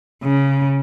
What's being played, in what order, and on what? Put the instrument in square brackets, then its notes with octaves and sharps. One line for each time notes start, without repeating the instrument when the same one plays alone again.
[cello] C#3